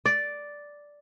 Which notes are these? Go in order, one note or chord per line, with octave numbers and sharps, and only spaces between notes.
D5